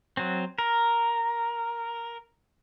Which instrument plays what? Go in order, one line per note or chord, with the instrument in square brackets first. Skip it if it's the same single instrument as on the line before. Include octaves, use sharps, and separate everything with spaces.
[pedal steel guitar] F#3 C4
A#4